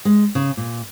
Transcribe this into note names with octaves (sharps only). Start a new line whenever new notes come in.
G#3
C#3
A#2